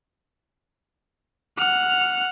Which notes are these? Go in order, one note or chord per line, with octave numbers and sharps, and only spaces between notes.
F#5 F6